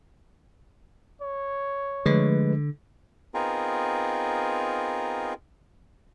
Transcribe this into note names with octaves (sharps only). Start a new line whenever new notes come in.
C#5
D3 F3 G#3 A3 B4
B3 C4 D#4 F4 G#4 A#4